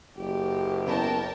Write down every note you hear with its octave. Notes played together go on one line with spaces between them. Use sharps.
F#1 G4
B3 C#4 E4 A#4 G5 A5